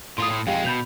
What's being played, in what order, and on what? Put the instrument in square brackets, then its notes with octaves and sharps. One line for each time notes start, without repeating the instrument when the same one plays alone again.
[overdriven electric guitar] A2 F4 [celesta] C6 D#6
[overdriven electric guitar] A2
[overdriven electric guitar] F2 G#3 [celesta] G4 F5 G5
[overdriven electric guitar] B2 [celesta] B5 G6 F7